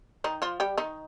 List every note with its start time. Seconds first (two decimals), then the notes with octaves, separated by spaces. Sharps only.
0.24 D#3 D#4
0.42 F3 F4
0.60 G3 G4
0.78 D#3 D#4